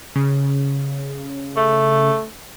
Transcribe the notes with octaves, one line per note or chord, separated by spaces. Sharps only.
C#3
A3